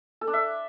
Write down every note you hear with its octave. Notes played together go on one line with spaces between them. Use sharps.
A4
D4
E5